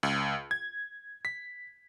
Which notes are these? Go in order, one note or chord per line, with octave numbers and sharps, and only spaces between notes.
C#2
G#6
B6